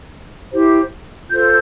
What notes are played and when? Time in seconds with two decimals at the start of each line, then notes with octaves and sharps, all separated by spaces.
0.52 E4 G4 C5
1.30 F4 A4 C5 G6